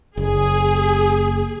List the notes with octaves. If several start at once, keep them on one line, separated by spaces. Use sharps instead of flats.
F#1 G#4